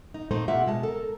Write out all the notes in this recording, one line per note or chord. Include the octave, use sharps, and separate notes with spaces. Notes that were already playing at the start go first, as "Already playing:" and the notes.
D#4
A#2 A3 C4 D#4 C5
B2 F4 G4 E5 F#5
B2 G#3 A5
A4 A#4